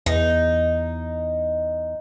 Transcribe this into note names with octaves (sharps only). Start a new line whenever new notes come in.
E2 D#4